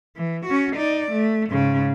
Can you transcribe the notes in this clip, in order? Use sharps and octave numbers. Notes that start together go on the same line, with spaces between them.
E3
C#4 F#4
D#4 D5
A3
G#2 C#3